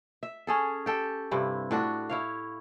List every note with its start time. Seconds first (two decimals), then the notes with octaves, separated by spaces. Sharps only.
0.23 E5
0.47 C#4 G#4 A4
0.86 G4 A4 G5
1.31 G2 C3 E4
1.71 A2 D4 F#4
2.09 E4 C#5 F5